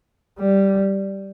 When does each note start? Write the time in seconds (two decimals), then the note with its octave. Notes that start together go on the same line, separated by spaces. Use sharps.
0.39 G3